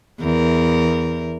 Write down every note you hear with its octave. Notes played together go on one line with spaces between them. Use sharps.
E2 A#4